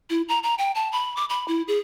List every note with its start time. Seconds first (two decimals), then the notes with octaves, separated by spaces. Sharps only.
0.10 E4
0.29 A#5
0.43 A#5
0.58 G5
0.75 A5
0.92 B5
1.17 D6
1.30 B5
1.48 E4
1.68 G#4